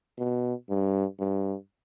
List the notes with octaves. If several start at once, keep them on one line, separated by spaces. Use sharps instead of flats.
B2
G2
G2